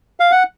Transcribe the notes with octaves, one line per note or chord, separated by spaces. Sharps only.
F5
F#5